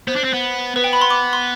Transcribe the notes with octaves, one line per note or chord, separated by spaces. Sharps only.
B3 C5
D4
C4
B3
B3 B4
G5
B5
C6
D6
C6